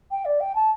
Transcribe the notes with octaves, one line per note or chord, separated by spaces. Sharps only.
G5
D5
G5
A5